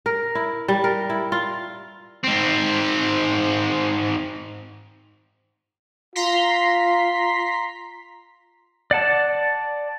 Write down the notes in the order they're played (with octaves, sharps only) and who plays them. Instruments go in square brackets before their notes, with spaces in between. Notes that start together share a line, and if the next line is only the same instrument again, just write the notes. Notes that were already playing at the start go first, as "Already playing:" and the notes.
[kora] A#4
E4
G3
A#4
E4
F4
[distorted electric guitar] G#2 C4
[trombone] F4 [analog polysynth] A#5 C6 B6
[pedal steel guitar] D5 F#5 A5